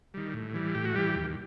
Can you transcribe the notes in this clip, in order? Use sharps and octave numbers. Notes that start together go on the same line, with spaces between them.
D#3 G3
A2
E3 G3
A2 G4
F#4
E3 G3 G4
D#2